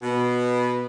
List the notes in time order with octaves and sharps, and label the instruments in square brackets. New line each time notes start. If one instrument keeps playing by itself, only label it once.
[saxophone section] B2